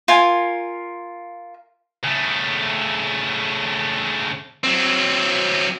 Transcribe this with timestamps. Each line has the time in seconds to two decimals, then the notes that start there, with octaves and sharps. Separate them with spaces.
0.08 F4 A#4 G#5
2.04 C#3 A3
4.64 F#3 C4